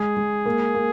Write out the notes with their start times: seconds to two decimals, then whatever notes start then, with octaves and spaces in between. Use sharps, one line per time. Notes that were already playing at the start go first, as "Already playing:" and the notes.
Already playing: G#3 G#4
0.16 G#3
0.46 A#3
0.75 A#3